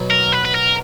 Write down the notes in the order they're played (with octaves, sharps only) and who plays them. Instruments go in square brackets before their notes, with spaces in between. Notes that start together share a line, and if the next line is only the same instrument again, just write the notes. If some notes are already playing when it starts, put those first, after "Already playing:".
Already playing: [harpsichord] B2 F#3 B3 D#4
[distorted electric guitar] A#4
B4
B4
A#4